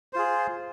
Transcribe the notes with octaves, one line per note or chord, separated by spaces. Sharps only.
F4 G#4 C5